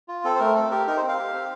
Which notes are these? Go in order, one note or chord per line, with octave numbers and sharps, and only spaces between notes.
F4
C4 A4
C5
A3 A#4
C4 A4
G4 A#4
D#4 A#4
C5
C4
F5
G4
C4